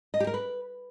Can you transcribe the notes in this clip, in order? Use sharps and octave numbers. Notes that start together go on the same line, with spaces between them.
D#5
G4
A#4
B4